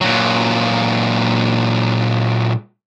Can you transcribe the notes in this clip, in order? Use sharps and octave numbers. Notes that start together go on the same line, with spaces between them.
A#2 F#3